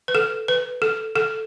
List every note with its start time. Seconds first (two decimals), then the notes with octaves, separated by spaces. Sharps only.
0.08 B4
0.15 A4
0.48 B4
0.82 A4
1.16 A4